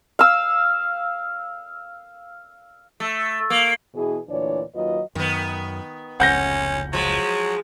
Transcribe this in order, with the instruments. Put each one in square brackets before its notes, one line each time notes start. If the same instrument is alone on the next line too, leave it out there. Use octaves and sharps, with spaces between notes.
[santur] F5 E6
[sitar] A3
A#3
[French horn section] B2 E3 G#4
D2 A#2 E3 D4 C#5 D5
D#2 F#3 F4 B4 D#5
[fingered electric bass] F#2 [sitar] D#3 B3
[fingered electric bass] F1 C#2 C#3 [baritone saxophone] C#4 [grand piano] F#5 G6 A#6
[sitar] F3 G#3 [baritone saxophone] F#3